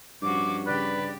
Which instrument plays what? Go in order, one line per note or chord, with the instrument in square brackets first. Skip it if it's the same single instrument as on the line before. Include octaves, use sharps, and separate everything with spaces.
[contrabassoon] G2 [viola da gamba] F3 C#4 F#4 [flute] D6
[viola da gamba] C#3 G4 [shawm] B4 [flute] D5